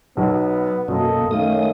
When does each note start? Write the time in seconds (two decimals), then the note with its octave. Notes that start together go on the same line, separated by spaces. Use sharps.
0.17 B1 B3
0.88 F#2 B2 A#3 A4 D#5
1.31 D#3 A3 C#4 F5 D#6